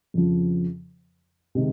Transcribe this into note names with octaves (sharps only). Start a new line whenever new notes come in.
F2 C#3 F3
C3 D#3 G#3